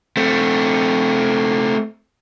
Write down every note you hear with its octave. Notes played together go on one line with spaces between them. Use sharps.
A3 C4